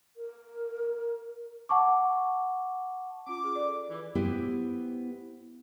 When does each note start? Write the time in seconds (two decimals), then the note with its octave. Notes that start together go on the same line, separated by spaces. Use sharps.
0.17 A#4
1.69 F#5 A5 C#6 D6
3.27 C#4 F4 D6
3.44 G#4
3.55 A4 D5
3.88 E3 E4
4.15 B3 E4 G4 C5